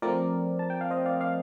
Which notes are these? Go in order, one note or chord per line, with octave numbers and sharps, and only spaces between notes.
F3 A3 C4 A#4 D5
A5
G5
F5
C5 D#5
D5 F5
D5 F5